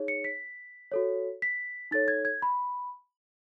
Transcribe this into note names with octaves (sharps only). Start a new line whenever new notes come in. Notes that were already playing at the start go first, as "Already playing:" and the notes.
Already playing: D#4 G#4 C#5
C#7
B6
F#4 A4 C#5
B6
D#4 A4 C#5 A6
G#6
G#6
B5